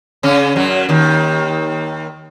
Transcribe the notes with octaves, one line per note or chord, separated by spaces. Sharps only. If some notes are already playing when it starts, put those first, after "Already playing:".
C#3 C#4
F#2 F#3
D#2 D#3